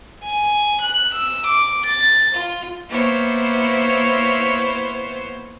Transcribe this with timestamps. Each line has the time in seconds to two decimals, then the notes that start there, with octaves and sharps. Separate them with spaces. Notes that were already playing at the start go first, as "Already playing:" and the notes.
0.24 G#5
0.81 F#6
1.14 E6
1.47 D6
1.86 A6
2.35 F4
2.89 A#3 B3 E4 C5 C#5